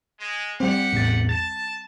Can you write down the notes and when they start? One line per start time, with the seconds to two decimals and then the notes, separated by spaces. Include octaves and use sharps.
0.20 G#3
0.60 G3 C4 G4 F#5
0.93 A1 E2 A6
1.29 A5 A6